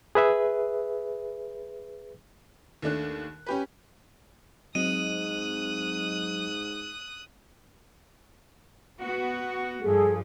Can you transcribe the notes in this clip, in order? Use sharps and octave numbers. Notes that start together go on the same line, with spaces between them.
G#4 B4 E5
D#2 A3 D4 F#6
C#4 G4 B4
G#2 F#3 C4 D#5 D#6 F#6 D#7
B3 F#4
G2 F3 G#4 A4